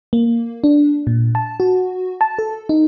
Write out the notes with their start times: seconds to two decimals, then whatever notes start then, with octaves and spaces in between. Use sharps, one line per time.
0.13 A#3
0.64 D4
1.07 A#2
1.35 A5
1.60 F#4
2.21 A5
2.39 A4
2.69 D#4